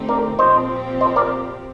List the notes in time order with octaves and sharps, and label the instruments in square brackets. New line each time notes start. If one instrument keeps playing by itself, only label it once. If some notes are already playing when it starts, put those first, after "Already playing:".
Already playing: [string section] D3 A3 C4 D#4 G4
[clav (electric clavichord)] A#4 D5
[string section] A#2 F3 C4 G4 [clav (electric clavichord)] C5 D#5
[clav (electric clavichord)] C5 D#5
A#4 D5